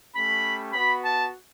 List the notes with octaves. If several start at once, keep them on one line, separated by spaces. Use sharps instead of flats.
A3 C#4 G4 B5
B3 F#4 B5
A5